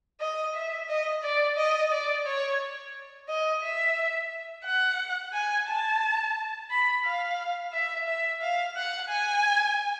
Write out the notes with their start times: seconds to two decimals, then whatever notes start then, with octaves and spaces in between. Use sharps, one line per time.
0.20 D#5
0.55 E5
0.88 D#5
1.23 D5
1.57 D#5
1.92 D5
2.26 C#5
3.28 D#5
3.63 E5
4.65 F#5
5.33 G#5
5.68 A5
6.70 B5
7.05 F5
7.73 E5
8.07 E5
8.41 F5
8.76 F#5
9.10 G#5